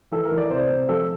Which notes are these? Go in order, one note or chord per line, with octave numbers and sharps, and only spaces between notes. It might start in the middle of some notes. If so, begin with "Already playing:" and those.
E3 A4
A#4
E3
D5
C3 C5
C3
F3 A4